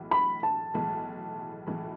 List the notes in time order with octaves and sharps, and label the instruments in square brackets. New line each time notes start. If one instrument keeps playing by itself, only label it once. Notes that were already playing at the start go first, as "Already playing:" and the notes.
Already playing: [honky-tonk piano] B1 A2 E3 G#3
[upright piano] B5
A5
[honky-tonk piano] B1 A2 E3 G#3
B1 A2 E3 G#3